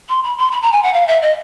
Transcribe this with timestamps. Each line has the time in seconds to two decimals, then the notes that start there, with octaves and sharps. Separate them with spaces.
0.09 C6
0.23 B5
0.38 C6
0.51 B5
0.62 A#5
0.72 G#5
0.83 F#5
0.93 F5
1.07 E5
1.22 D#5